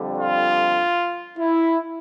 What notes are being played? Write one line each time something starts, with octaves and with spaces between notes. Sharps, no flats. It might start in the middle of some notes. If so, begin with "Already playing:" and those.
Already playing: F2 D3 G3
F4
E4